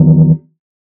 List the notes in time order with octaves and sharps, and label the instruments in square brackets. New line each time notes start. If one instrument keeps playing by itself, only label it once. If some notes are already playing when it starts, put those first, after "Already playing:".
Already playing: [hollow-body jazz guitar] E2 D#3 F#3